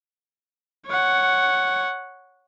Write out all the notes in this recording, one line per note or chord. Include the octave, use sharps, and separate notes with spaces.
C#5 F#5